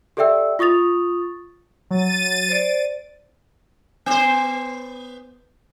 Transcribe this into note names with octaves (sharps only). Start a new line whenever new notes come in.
G4 A4 D5 E5 G5 E6
F4 C#6 D#6 A6 F7
F#3 A6 D#7
C5 D5
B3 C5